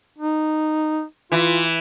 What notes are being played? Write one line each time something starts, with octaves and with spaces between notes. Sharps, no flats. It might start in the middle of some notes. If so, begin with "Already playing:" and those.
D#4
E3 F4